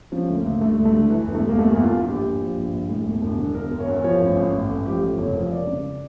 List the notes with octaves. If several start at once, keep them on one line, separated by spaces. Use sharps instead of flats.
F3 C#4
D2
A#3
D2
D3 A3
D2
A3
D3
E3
E1
A3
E1
A#3
E2 A3
E2 A#3
F4
E1
A#1 G4
A#1
F3
A#1
A#1
A2
E1
E1
D3
E1 A#4
E1
C#5
E2
A#4
F3 C#5
A1
A1
A1
A1
F3 G4
F3 A4
F1 C#5
F3 A#4
F1 D5
C#3